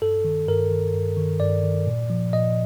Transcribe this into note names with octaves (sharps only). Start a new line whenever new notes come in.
G2 A4
D#3
G2 A#4
D#3
G2
D#3
G2 D5
D#3
A#2
F3
A#2 D#5